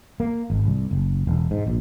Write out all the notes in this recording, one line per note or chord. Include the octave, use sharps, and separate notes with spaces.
A#3
G#1
C2
F#1
E1
G#2
A#1